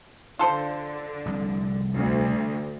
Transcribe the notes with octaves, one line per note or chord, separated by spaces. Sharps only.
D3 F4 A4 C5
F1 C2
D2